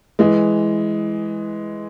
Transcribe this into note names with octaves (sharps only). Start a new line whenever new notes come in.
E3 G#3